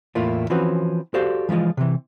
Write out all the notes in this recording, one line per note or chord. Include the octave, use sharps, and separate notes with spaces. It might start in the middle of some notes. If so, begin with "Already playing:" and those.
E2 A2 A3 A#3 E4 F4
E3 F3 C4 C#4 F#4 B4
F#4 G4 A4 C5 D5 F5
E3 F3 G#3 F4 D#5
C3 E3